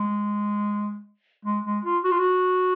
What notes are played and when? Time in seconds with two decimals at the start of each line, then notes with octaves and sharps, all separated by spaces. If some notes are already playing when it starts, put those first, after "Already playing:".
Already playing: G#3
1.45 G#3
1.65 G#3
1.84 F4
2.04 F#4
2.11 F4
2.19 F#4